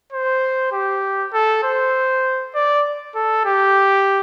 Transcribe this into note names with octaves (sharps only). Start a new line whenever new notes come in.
C5
G4
A4
C5
D5
A4
G4